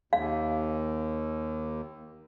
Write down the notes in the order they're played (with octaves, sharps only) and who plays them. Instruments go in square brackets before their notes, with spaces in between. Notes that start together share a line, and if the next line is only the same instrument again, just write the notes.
[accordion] D#2 [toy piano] F5